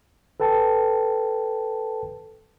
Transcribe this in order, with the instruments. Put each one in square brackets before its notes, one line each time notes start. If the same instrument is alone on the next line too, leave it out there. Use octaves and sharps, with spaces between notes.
[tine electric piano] A4 B4 G5 A5